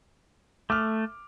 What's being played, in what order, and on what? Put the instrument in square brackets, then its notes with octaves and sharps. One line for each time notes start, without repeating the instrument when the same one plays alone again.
[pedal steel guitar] A3 [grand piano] D6 F6